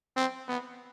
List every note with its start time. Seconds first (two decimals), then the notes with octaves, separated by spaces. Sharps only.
0.16 C4
0.48 B3